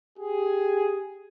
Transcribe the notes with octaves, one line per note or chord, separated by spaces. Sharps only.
G4 G#4